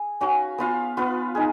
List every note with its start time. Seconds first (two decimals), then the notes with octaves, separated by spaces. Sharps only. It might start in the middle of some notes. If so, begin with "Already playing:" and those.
Already playing: G#4
0.21 C#4 F#4 B4 F5
0.58 B3 F4 B4 F5
0.97 B3 F4 B4 F5
1.35 D#4 G#4